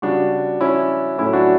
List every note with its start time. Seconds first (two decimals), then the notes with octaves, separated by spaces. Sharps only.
0.02 C#3 G3 D4 F#4
0.61 C#4 E4
1.18 A2 F#3 A3 C#4 E4
1.33 D4 F#4